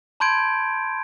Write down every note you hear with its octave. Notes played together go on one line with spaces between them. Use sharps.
A5 B5 C6 G6 G#6 D7